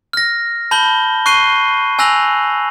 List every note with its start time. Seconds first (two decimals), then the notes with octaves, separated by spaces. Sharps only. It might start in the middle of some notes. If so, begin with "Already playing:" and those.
0.13 F6 A#6
0.71 A5 B5 G6 F#7 G7
1.26 C#6 F#6 C7 D#7 G7
1.99 G#5 E6 F#6 A#6 F7 F#7